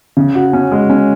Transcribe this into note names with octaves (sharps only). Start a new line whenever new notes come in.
C#3
F#4
C#4
G#3
C#4